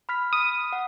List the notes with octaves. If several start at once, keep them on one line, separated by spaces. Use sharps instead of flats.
B5 F6 B6
D#6
F#5